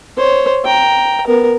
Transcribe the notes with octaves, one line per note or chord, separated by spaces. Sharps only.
C5 C#5
G5 A#5
B3 A#4